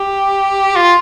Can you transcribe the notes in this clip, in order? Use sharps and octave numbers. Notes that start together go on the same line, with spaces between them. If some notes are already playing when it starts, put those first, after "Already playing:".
Already playing: G4
F4